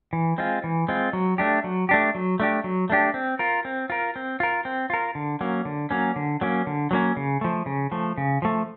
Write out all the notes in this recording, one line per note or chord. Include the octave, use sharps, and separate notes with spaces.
E3
G#3 C4 F4
E3
G#3 C4 F4
F#3
A3 D4 G4
F#3
A3 D4 G4
F#3
A3 D4 G4
F#3
A3 D4 G4
C4
F4 A#4
C4
F4 A#4
C4
F4 A#4
C4
F4 A#4
D3
F#3 A#3 C#4
D3
F#3 A#3 C#4
D3
F#3 A#3 C#4
D3
F#3 A#3 C#4
C#3
F3 A3
C#3
F3 A3
C#3
F3 A3